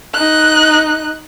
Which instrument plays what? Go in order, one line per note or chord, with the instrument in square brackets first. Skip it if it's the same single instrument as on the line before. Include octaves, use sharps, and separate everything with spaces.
[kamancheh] D#4 F#6